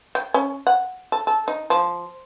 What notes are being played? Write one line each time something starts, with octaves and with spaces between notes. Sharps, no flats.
G5
C#4
F#5
A4
A4
D#4
F3